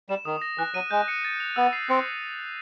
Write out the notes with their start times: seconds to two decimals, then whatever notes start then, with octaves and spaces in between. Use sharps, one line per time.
0.09 G3 E7
0.25 D#3 D#6
0.42 A#6
0.58 E3 F#6
0.74 F#3 D#7
0.91 G#3 G6
1.08 C#7
1.25 A6
1.40 F7
1.56 B3 E6
1.73 C7
1.89 C4 C#7